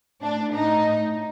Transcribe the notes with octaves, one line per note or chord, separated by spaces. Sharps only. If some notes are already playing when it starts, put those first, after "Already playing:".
A2 D4
A2 D#4
A2